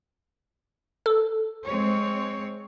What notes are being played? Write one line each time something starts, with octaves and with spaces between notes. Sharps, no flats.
A4
G#3 C4 C#5